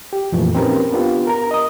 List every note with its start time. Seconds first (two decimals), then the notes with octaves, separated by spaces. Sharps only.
0.13 G4
0.32 F2 A#2 E3 F3 A3
0.55 C4 C#4 D#4 G4 A#4 B4
0.92 B3 D4 F4 G4
1.27 A#4 A#5
1.51 D#5 D#6